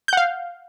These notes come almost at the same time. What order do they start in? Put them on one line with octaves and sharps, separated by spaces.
G6 F#5 F5